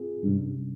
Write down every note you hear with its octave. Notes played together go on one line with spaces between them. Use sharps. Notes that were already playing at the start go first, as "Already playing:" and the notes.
Already playing: C4 F4 G#4
G2 C3 G3 C#4